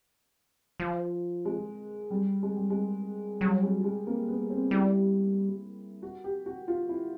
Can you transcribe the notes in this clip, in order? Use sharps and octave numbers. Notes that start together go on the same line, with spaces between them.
F3
G#3
G3
G#3
G3
G#3
F#3 G3
G#3
G#3
A#3
B3
C4
G3 E4
F#4
G4
F#4
F4
E4